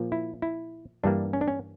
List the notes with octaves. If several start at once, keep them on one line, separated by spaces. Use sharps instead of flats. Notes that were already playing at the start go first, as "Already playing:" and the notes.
Already playing: A#2 F3 A#3
E4
E4
G2 E3 G3 A#3 D4
C#4
D4
C#4